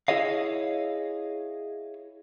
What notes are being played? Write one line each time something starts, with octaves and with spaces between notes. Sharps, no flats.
E4 G#4 C#5 D#5 F5